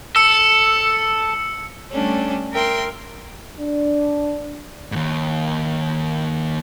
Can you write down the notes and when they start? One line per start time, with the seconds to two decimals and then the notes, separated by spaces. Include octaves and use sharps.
0.16 A4 E6 C#7
1.92 G3 A3 C#4 D4
2.53 A#4 E5 G5 C6
3.59 D4
4.92 D#2 G#2